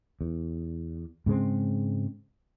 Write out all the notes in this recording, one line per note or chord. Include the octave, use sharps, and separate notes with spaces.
E2
G#2 C#3 G#3 C4